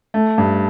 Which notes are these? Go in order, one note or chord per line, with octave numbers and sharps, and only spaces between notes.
A3
G2